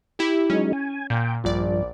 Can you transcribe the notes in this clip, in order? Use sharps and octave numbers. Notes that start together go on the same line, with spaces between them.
E4 G4
F#3 G#3 C#4 D#4
G#5
A#2 G5
A#1 G2 F3 D5